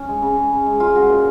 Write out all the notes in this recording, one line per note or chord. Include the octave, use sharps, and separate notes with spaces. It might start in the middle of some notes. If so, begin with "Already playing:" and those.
Already playing: C#4
G#3
C#3
G#3
C#3
G#3
C#3 F4
G#3 F#4
A#2